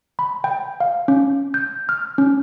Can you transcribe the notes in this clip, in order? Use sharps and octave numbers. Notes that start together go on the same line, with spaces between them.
B5
G5
F5
C#4
G6
F6
C#4